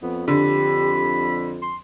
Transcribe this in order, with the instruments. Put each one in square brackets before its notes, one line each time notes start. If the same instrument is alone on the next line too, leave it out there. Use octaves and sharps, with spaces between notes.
[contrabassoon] F2 [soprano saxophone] B3
[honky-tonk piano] D3 [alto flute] G4 [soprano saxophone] B5
[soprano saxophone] C6